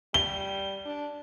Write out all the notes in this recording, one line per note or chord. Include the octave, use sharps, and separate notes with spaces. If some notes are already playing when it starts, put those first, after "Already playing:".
G3 G7
D4